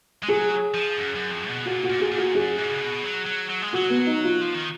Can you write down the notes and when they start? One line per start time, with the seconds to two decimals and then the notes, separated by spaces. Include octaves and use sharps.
0.23 G#3
0.28 F#3 G#4
0.74 F3
0.97 F#2
1.15 F#2
1.31 F2
1.49 B2
1.65 A#2 F#4
1.84 F#4
1.90 A#2
2.00 G#4
2.11 A#2
2.18 F#4
2.35 F#2 G#4
2.58 G#2
2.70 C#3
2.80 B2
3.04 F#3
3.26 F#3
3.50 F#3
3.62 G#3
3.73 F#3 F#4
3.90 B3
4.07 D#4
4.24 F4
4.41 F3
4.55 D#3